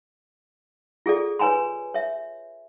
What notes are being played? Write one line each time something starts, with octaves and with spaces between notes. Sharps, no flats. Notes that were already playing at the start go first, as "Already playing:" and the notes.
F4 G#4 A4 D5
B4 C#5 G#5 A#5 C6
C#5 E5